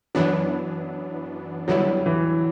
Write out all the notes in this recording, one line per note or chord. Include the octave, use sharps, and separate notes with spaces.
F#2 E3 F#3 B3 D4
E2 D3 F#3 G3 B3 E4
E3